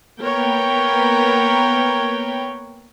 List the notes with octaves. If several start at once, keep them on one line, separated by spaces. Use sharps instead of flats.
A#3 B3 A#4 B4 C#5 G5